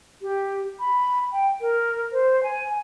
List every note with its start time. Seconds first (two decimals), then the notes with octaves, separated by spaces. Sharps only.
0.22 G4
0.80 B5
1.32 G5
1.61 A#4
2.12 C5
2.43 G#5